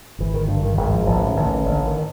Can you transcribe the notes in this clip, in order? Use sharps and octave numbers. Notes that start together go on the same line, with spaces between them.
G#1 E3
D#3
G2 D3
D#3
G#1 D#3
F3
A1 F3
D#3
A1
D#3
A1 D3
D#3